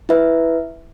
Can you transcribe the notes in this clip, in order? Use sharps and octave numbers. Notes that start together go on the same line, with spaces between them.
E4 B4 E5